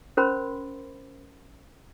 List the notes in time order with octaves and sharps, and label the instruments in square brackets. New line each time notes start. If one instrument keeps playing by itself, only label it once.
[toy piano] C#4 A#4 C5 B5 C6